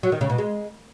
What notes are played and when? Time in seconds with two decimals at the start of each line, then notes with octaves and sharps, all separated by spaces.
0.03 F#3
0.12 D#3
0.21 C#3
0.30 B2
0.38 G#3